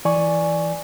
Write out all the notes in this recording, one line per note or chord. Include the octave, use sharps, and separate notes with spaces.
E3 D5 G#5 C#6